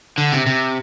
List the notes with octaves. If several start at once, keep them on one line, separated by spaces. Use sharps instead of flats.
D3
C3
C3